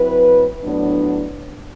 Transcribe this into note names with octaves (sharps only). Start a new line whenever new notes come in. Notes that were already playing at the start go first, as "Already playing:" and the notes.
Already playing: F#3 C4 E4 B4
A2 F#3 B3 D4